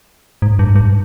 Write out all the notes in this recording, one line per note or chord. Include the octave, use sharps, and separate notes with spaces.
G#2
G2
G2